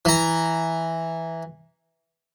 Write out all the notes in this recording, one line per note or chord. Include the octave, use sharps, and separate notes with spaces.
E3 A#5